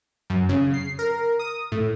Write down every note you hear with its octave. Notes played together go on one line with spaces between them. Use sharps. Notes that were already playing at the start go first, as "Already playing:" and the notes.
F#2
C#3
C7
A#4
D#6
A2